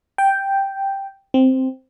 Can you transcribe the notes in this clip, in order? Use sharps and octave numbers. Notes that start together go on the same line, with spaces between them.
G5
C4